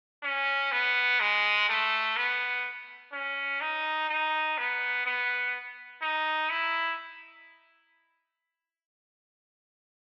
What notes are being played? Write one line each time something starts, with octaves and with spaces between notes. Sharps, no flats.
C#4
B3
G#3
A3
B3
C#4
D#4
D#4
B3
B3
D#4
E4